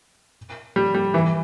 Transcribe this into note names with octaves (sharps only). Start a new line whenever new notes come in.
G3
G3
E3